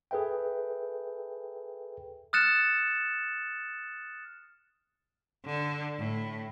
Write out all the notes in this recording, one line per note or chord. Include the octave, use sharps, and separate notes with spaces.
G#4 A4 B4 E5 G5
D#6 F6 F#6 A6 C#7 E7
D3
A2